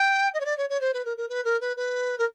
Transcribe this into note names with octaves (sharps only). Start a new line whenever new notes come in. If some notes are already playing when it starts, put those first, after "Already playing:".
Already playing: G5
D#5
C#5
D5
C#5
C#5
C5
B4
A#4
A#4
B4
A#4
B4
B4
A#4